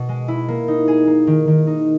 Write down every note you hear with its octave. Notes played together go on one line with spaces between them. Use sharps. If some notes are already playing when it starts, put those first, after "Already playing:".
Already playing: B2
G#3
E4
A#3
D#4
G#4
A#3
D#3
D#3
D#4